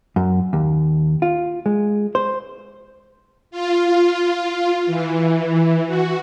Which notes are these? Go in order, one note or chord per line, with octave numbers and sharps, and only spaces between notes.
F#2
D#2
F4
G#3
C5
F4
E3
F#4